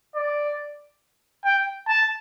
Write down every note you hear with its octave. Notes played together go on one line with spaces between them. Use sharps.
D5
G5
A5